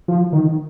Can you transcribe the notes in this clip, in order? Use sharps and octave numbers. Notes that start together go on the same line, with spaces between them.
F3
D#3